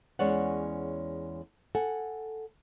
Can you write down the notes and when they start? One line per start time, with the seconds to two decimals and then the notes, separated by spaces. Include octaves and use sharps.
0.19 E2 G#3 C#4 C#5 D5 F#5
1.75 A4 F#5 G#5